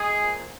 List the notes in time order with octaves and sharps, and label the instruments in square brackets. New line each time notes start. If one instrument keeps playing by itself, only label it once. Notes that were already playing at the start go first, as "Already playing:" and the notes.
Already playing: [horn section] G#3 G#4
A#2 F3